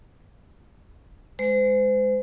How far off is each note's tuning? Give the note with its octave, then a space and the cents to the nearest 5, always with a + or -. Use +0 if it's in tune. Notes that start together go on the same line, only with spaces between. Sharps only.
G#3 +0 C5 -35